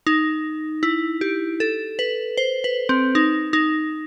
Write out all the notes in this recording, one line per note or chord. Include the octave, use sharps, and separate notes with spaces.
D#4
E4
G4
A4
B4
C5
B4
C4
D#4
D#4